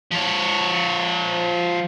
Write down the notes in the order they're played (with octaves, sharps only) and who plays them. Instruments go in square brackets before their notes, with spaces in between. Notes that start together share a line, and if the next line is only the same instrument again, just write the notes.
[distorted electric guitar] F3 C#5